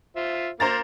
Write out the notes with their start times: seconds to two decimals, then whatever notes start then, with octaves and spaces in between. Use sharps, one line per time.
0.16 F4 C5 E5
0.60 A#3 A#4 C5 A#5 A6